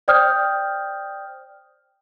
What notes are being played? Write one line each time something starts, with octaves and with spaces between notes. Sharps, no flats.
C5 D5 G5 D#6 F6 G6